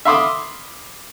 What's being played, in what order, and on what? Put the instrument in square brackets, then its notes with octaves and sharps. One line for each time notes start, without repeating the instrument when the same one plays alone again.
[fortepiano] E5 F5 B5 C6 D6 D#6